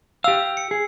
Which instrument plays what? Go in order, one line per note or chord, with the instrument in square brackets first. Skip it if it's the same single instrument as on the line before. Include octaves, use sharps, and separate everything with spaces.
[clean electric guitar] G4 F5 [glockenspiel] E6
[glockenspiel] C#7
[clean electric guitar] G#4